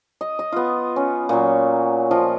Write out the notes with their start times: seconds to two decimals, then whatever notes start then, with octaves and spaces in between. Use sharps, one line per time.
0.21 D#5
0.39 D#5
0.52 B3 F4
0.96 C#4
1.29 A#2 F#3
2.11 F3 F4 D#5